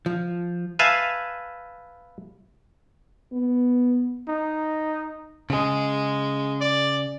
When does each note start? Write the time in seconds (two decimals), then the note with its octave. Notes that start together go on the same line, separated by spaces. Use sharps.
0.06 F3
0.79 B4 E5 F5 G#5 A5
3.33 B3
4.28 D#4
5.50 C#3 G#3 G#4
6.61 D5